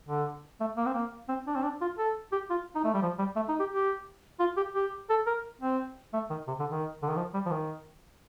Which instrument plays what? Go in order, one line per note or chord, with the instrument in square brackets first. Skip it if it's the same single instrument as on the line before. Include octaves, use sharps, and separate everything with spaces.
[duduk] D3
A3
A#3
C4
A#3
C4
D4
C4
D4
F4
A4
G4
F4
D#4
A3
G3
F3
G3
A3
D#4
G4
G4
F4
G4
G4
A4
A#4
C4
A3
D#3
C3
D3
D#3
D3
D#3
F3
G3
F3
D#3